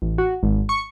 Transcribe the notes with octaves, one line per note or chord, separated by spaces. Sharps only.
A1
F#4
G#1
C#6